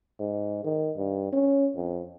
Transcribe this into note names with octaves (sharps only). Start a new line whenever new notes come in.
G#2
D#3
G2
C#4
F2